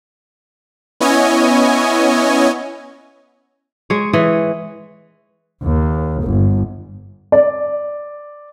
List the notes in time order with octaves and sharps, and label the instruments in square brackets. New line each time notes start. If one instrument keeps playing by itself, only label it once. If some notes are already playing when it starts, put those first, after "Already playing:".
[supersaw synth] B3 C#4 E4 C#5 D#5 G#5
[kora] G#3 C#5
E3 C#5 D#5
[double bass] D#2
G1
[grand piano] D5